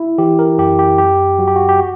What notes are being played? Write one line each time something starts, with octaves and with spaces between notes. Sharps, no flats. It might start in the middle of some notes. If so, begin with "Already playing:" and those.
Already playing: E4
E3 G4
A#4
F#2 G4
G4
F#2 G4
F#3 F#4
G4
F#4
G4
F#4